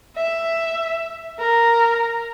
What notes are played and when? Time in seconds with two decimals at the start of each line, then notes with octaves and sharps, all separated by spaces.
0.17 E5
1.39 A#4